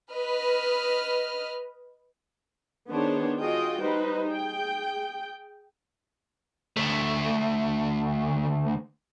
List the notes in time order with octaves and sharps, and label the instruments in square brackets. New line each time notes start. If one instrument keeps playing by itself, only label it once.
[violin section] B4 D#5 F6
[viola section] D#3 B3 D4 G#4 C5 C#5
F4 F#4 G#4 D#5 G5
G3 D#4 B4 C5
G#4 G5
[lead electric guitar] D2 A3